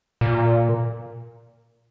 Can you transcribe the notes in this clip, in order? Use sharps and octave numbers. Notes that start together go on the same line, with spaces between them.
A#2